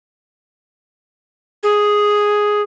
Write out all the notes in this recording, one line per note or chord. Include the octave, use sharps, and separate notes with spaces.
G#4